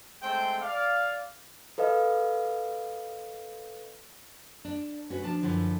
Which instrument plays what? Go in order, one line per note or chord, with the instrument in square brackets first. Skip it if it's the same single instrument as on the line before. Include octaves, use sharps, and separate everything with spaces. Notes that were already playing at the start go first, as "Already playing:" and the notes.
[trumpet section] G#3 A3 C4 C5 G5
D5 F5
[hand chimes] A4 B4 D#5 F5
[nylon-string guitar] D4
C#4 F#4 B4
F3 D4 A5
F#2 D3 E3 F3